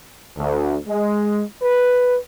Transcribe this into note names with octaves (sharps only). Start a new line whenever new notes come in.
D2
G#3
B4